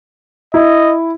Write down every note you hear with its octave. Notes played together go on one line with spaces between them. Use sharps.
E4 D#5